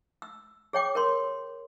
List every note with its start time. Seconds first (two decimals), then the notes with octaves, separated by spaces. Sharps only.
0.22 E6
0.73 G#4 C#5 G5 D6
0.95 A#4 C#5 C6